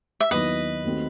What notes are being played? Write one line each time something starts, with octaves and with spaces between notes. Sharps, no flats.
E5
D#2 D#3 F#3 B3 E4 B4 D#5
D#2 D#3 A3 C4 F#4